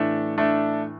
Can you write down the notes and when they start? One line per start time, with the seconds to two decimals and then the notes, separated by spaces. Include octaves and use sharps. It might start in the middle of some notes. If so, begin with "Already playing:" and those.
Already playing: A2 E3 A3 D4
0.38 A3 D4